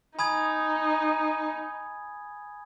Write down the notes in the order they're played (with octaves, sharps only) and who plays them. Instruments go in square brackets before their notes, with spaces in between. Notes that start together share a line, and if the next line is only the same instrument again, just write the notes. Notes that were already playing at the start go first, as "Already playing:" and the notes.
[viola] D#4 [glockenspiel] G#5 B5 D#6 G#6